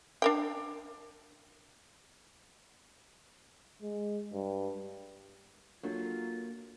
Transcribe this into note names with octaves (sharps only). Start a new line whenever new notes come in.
D4 A#4 G5
G#3
G2
F#3 A3 A#3 D4 F4 F#4